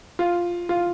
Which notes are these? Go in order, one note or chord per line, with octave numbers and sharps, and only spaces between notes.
F4
F4